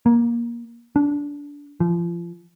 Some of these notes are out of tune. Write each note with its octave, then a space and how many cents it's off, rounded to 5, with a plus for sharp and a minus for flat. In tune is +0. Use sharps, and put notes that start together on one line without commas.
A#3 +15
D4 -20
F3 -30